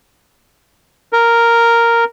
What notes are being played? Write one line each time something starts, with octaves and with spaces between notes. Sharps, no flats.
A#4